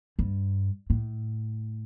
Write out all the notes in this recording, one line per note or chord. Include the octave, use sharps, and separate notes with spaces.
G2
A2